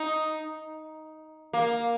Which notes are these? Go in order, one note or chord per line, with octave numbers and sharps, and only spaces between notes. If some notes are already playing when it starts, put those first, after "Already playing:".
Already playing: D#4
A#3